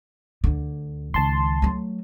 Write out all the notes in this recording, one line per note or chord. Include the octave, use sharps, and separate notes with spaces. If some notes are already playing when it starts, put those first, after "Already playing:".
D2 D3
C#2 D#3 A5 C6
F#3 A3